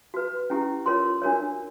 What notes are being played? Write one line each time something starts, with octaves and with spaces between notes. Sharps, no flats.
F#4 B4
C#4 E4 G4
F4 A#4 C#5 C6
D4 F#4 A#4 C#5